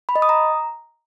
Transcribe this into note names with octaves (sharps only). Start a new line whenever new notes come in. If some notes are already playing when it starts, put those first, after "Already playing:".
B5
D#5
D#6
A#5